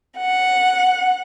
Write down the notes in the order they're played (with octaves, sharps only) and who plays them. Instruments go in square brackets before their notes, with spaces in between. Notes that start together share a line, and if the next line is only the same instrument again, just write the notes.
[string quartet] F#5